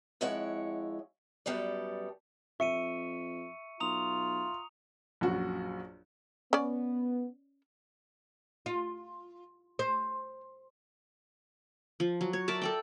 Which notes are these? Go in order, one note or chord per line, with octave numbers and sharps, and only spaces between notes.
F2 G#3 E4 C#5 F#5
F#2 G3 B3 A4 D5
F2 E5 C#6 C#7 D#7
B1 F4 A#5 D#6 F7
A#1 F#2 F#4
B3 C#4 D5
F4
C5
F3
F#3
C#5
A#4 D5 E5 A5
A4 D5 G5